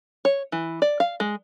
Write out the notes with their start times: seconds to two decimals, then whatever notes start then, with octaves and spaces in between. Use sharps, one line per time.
0.25 C#5
0.52 E3
0.82 D5
1.00 F5
1.20 G#3